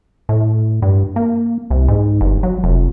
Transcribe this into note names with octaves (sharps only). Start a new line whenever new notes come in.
A2
G2
A#3
C2
G#2
G1
F#3
F1